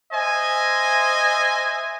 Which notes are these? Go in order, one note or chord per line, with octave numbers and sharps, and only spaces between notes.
C5 D#5 E5 G#5